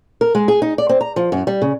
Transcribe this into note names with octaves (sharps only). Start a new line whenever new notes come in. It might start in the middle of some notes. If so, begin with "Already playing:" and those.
A#4
G#3
G#4
D#4
D5
C4
A#5
F3
F#2
G3
C#3